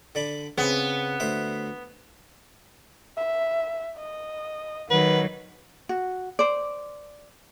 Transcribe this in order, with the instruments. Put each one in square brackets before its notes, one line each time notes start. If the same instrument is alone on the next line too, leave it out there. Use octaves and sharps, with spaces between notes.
[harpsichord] D3 D5 B5
[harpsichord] C#3 C4 [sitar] B3
[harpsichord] D2 C5 E5
[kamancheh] E5
D#5
[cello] D#3 F#3 [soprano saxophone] B4 [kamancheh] F#5
[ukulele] F#4
C5 D5